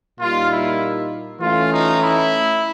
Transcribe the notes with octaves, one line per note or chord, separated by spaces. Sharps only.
A#2 G3 A#3 D#4 F4
E4
E3 A3 C#4 F4
D#4
E4